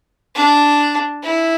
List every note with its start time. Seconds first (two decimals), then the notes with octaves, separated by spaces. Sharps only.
0.35 D4
1.23 E4